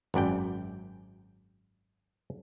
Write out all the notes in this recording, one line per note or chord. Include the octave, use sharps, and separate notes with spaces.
G#1 F#2 D5 G5